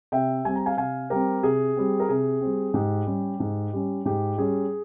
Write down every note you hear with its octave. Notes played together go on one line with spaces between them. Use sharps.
C3 E5 G5
G3 C4 G#5
A#5
F5 G#5
C3 F5 G#5
G3 C4 G4 A#4
C3 G#4
G3 C4
A#4
C3 G#4
G3 C4
G#2 G4
G3 C#4
G#2
G3 C#4
G#2 G4
G3 C#4 G#4